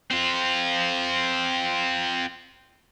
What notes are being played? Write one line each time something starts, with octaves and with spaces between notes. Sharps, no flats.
C4 F4